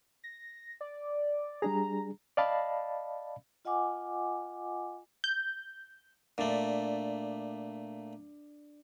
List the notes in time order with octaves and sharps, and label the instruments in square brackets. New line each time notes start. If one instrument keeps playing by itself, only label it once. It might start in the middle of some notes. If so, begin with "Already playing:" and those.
[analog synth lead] A#6
D5
[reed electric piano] G3 D4 G#4 [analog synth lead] A#5
[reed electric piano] D5 D#5 F5 A5 B5
[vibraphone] F4 D#5 F#5 G#5 D6
[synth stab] G6
[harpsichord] A#2 A3 [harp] D4